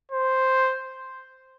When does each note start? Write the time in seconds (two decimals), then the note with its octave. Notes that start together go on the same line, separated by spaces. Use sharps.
0.12 C5